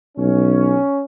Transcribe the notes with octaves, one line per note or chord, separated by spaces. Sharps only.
B1 C#4